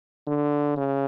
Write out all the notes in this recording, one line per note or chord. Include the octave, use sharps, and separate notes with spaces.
D3
C#3